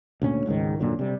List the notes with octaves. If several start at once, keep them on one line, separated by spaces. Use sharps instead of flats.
D2 A#2 C#4
G#1 C#2 G#2 D#3
F#2 A#2 D3 F#3
C3 G3